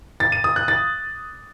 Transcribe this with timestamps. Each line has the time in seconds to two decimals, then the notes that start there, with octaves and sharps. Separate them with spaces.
0.20 A6
0.32 D#7
0.44 D#6
0.56 F#6
0.68 A6